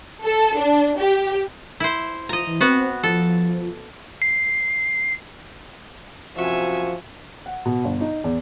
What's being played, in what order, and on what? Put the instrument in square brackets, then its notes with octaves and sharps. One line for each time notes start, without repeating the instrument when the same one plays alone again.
[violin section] A4
D4
G4
[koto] E4 C5
[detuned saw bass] F3 [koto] D#5 A#5
[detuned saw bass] E3
[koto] B3 F#4 [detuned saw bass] C4
[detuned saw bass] F3 [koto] A4
[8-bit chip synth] C7
[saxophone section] F#2 C3 F#4 [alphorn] F3 [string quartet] E5 G#5
[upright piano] F#5
B2
G1
D#4
E2